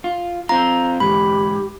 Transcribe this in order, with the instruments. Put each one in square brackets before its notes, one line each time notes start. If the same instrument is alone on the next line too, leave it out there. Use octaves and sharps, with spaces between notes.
[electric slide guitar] F4
[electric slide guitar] C4 F4 [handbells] A#5
[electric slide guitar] G#2 E3 [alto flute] G4 [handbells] B5